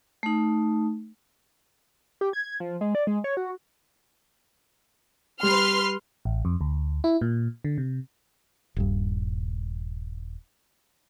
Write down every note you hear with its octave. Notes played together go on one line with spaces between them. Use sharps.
A3 D#4
G4
G#6
F3
G#3
D5
G#3
C#5
F#4
G3 B4 C6 F6
A1
F2
D2
E4
A#2
D3
C3
D#1 G2